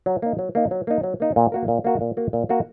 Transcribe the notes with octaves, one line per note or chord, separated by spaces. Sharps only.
F#3
A#3 D#4
F#3
A#3 D#4
F#3
A#3 D#4
F#3
A#3 D#4
A#2
A#3 F#4 A#4
A#2
A#3 F#4 A#4
A#2
A#3 F#4 A#4
A#2
A#3 F#4 A#4